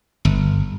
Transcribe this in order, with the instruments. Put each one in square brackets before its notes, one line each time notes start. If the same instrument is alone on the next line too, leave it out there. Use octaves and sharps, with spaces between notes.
[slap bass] G1